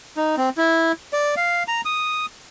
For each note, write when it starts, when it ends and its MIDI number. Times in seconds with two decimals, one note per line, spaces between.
0.17 0.36 63
0.37 0.49 60
0.57 0.92 64
1.13 1.35 74
1.37 1.63 77
1.68 1.81 82
1.85 2.26 87